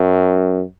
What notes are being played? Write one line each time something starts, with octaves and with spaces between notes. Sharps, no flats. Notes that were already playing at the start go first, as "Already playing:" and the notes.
Already playing: F#2